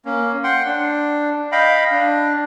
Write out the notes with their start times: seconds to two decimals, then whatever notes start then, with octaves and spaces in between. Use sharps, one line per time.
0.05 A#3 C#4
0.44 F#5 G5 C6
0.65 D4
1.52 D#5 F5 G5 B5
1.91 D4